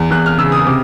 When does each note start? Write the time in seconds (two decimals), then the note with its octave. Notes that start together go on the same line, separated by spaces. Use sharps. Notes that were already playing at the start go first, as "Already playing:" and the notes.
Already playing: E2
0.11 E2 F#6
0.26 F6
0.38 C#3 E6
0.52 D#6
0.66 C3 D6